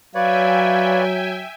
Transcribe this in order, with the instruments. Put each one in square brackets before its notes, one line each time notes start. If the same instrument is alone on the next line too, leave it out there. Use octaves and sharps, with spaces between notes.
[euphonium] F#3 [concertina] B4 C#5 D5 [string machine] E5 G5 G#5 [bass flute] F5